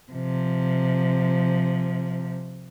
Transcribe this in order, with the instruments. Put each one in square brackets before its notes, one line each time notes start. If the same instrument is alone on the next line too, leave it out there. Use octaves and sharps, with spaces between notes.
[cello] C3 F3